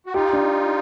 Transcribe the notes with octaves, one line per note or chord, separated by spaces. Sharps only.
F#4
D#4 F4 G4
D4